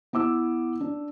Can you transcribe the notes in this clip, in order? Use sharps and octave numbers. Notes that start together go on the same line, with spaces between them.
B3 E4 D6 E6
D4